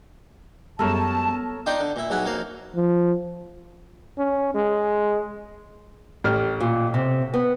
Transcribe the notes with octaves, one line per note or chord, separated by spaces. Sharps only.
F#2 G3 G#3 B3 A4 A#4 C#5 A5
D4 D#4 F4 D#5 G5
D3
A#2 E4
B1 F#3 E4 G#4 F#5
F2 F#3 A#3 F5
F3
C#4
G#3
A1 G4 F6
A#2
C3
B3